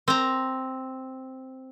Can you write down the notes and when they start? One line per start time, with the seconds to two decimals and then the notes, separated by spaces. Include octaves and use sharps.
0.08 C4 A#5